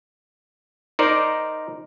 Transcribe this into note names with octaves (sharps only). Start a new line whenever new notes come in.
D#4 A#4 C5 D5